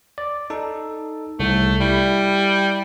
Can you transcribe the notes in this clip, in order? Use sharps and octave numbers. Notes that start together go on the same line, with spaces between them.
D5
D#4 A4
C2 A3
G3 E4